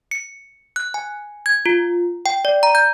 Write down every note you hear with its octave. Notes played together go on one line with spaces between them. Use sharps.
C#7
F#6
G#5
G#6
F4
G5
D5
A#5
G6